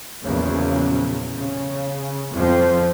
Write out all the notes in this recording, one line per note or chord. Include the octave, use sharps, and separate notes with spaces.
A#1 E2 C#3 F#3
C#3
F2 F3